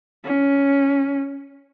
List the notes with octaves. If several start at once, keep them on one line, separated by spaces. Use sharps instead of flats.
C#4